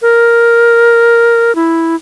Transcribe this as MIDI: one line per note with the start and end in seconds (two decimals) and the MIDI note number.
0.02 1.54 70
1.55 1.95 64